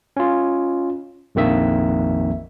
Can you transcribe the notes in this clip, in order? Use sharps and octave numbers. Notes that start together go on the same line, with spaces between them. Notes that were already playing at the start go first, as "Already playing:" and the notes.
C#4 F4
A#1 F2 D#3 A#3 E5